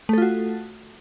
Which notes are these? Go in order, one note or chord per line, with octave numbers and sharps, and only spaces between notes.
A3 F4 F#4 A4